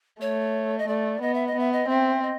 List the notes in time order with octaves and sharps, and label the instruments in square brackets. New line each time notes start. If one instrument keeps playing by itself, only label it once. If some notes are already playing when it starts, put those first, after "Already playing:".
[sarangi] A3 [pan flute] C#5
[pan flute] D#5
[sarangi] A3 [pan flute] D5
[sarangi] B3 [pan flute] D#5
[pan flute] E5
D#5
[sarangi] B3 [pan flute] E5
[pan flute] D#5
[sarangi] C4 [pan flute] E5
[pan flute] D#5